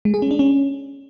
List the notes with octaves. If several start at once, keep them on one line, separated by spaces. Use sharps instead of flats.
G#3
G#4
C#4
D4
C#4